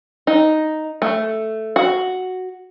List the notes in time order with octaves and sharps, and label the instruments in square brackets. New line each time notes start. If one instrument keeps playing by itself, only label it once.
[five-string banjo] D#4
A3
F#4